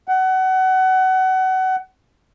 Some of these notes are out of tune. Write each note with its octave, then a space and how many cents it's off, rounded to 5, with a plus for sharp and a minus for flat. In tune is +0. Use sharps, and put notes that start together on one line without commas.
F#5 +25